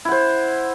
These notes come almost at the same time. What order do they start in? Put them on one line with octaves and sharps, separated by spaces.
E4 F#5 C5